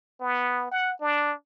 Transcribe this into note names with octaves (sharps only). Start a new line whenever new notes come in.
B3
F#5
D4